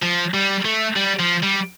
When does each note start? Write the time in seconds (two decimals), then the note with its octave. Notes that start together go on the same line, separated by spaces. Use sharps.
0.03 F3
0.34 G3
0.65 A3
0.96 G3
1.20 F3
1.43 G3